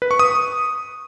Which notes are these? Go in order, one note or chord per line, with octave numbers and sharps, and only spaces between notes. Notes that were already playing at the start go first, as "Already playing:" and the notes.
B4
C#6
D#6